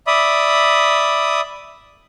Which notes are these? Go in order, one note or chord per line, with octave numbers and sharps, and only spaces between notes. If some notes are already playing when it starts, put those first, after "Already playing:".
D5 E5 B5 D#6